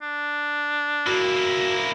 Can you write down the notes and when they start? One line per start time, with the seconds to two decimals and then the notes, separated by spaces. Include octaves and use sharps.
0.02 D4
1.07 A#3 E4 F#4